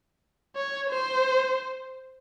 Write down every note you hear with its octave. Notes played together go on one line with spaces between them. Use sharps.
C#5
C5